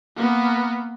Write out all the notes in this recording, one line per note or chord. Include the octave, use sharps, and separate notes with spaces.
A#3 B3